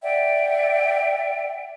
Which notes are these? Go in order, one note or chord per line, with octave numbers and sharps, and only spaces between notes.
D5 E5 F#5 G5